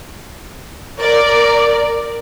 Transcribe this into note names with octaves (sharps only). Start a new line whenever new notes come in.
A#4 D5